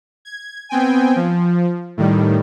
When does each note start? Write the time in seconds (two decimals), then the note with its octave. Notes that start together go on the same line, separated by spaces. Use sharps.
0.25 G#6
0.69 B3 C4 G5 G#5
1.16 F3
1.97 A2 D#3 G3